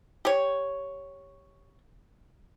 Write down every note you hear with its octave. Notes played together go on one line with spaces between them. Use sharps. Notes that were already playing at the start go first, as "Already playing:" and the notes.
G4 C#5